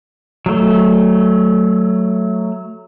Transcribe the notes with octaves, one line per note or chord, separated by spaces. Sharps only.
F#3 A3